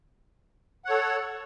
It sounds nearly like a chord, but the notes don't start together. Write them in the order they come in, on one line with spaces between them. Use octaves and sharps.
F#5 C#5 A4